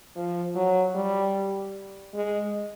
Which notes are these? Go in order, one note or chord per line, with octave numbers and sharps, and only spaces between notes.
F3
F#3
G3
G#3